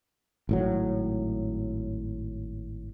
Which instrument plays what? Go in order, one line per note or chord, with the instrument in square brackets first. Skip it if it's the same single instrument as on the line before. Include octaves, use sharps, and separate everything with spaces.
[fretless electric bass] G#1 A2 F#3